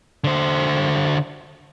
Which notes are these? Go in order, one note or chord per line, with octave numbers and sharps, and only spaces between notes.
D3 C5